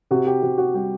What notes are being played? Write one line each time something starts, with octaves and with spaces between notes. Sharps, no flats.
C3 F#4
G4
C3 F#4
F#4
G3 G4